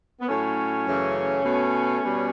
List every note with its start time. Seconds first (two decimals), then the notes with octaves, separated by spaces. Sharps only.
0.21 B3
0.28 A2 F#3 A3 C#4
0.86 F#2 C#3 E3 A3
1.43 B2 A3
2.01 B2 G3